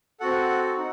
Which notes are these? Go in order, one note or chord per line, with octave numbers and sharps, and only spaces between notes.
C4 F#4 A4 F#5
D#4 F#5